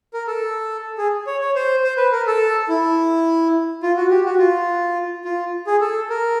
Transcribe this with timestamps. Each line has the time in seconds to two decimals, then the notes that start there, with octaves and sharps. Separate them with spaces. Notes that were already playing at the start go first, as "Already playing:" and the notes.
0.13 A#4
0.27 A4
0.98 G#4
1.27 C#5
1.41 C#5
1.55 C5
1.84 C5
1.97 B4
2.12 A#4
2.27 A4
2.69 E4
3.83 F4
3.96 F#4
4.10 G4
4.25 F#4
4.39 F4
5.25 F4
5.67 G#4
5.81 A4
6.09 A#4